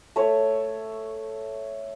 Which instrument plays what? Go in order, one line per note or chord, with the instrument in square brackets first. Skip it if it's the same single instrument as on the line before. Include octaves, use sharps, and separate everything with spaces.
[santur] A3 C#5